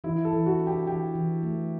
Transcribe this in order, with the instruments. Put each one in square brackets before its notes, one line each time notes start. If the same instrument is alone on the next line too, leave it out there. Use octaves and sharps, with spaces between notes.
[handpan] E3 [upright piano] E4
[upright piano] A4
[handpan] E3
[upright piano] F#4
[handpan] D4
[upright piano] G4
[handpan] E3 [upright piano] G4
[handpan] E3
A3